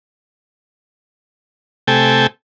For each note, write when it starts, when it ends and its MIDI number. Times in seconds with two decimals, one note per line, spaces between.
1.88 2.27 48
1.88 2.27 57
1.88 2.27 69
1.88 2.27 79
1.88 2.27 80